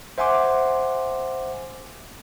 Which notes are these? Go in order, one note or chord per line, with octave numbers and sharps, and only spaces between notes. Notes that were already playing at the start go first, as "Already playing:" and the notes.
C5 E5 F#5 G#5 C6 D6